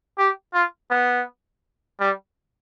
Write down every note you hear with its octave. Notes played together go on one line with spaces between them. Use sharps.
G4
F4
B3
G3